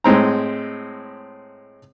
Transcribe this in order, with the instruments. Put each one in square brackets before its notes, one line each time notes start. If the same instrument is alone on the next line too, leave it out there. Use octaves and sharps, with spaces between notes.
[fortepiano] A2 G#3 C4 A#5